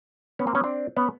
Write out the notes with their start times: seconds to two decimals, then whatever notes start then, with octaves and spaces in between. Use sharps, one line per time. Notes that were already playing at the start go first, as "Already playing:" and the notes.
0.39 B3 C#4
0.47 A#3 C4
0.55 B3 C#4
0.64 C4 D4
0.96 B3 C#4